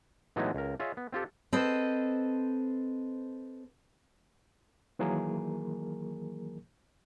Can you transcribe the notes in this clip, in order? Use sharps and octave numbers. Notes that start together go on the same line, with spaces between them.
A2 E3 F#3 G#3 B3 D#4
C#2 A#4
F4 G#4 C#5 D#5 E5
B3
C4 F4 G4 A4
C4 A4 B4 C5 D#5
D#3 E3 F#3 A#3 G#4 A#4